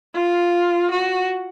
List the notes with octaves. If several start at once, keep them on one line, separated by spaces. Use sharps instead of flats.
F4
F#4